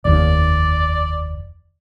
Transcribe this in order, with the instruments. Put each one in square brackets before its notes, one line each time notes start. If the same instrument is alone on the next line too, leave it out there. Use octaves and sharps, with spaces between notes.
[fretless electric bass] F1 D#2 [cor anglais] D5